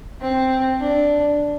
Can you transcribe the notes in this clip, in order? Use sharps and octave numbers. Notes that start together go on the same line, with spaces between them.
C4
D4